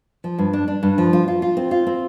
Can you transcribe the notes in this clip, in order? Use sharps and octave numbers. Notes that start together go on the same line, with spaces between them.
F3
G2
D4
D4
G2
F3
F4
F4
F4
C4
F4
C4